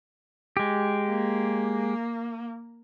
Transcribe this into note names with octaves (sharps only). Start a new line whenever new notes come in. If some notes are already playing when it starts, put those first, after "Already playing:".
G#3 G4
A#3